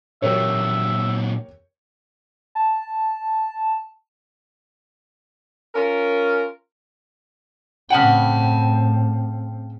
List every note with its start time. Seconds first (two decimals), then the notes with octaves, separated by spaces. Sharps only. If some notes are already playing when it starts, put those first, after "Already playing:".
0.22 A#2 F#3 G4 A#4 C#5 E5
2.55 A5
5.75 C#4 F4 A#4
7.90 A2 C#3 C4 F#5 G5 A5